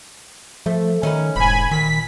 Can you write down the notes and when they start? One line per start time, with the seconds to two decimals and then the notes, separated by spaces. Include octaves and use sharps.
0.66 F3 A3
1.03 D#3 C#4 D#4 B4
1.36 E1 G#2 G#5 B5
1.71 A#2 D#3 B6